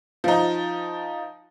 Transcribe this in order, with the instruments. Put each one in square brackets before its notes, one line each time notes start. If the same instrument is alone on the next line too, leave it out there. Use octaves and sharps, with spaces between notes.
[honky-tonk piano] F3 D#4